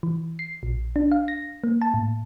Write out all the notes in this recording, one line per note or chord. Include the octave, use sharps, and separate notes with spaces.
E3
C7
A#1
D4
F5
A#6
A#3
A5
A2